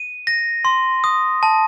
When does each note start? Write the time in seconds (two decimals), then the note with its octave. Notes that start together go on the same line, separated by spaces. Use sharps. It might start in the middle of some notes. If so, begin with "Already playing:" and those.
Already playing: D#7
0.27 A#6
0.65 C6
1.04 D#6
1.43 A5